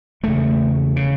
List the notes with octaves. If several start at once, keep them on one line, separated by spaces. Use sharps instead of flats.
E1 E2 C#3 A3
C#3